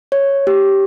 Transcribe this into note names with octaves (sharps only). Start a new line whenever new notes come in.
C#5
G4